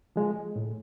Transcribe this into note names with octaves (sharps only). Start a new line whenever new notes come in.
F3 G#3
A2